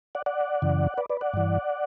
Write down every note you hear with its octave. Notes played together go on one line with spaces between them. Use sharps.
D5 F#5
D5 F#5
F#2 C#3 E3
B4 D5
B4 D5
D5 F#5
G2 E3